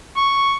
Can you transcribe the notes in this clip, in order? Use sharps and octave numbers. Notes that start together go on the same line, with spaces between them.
C#6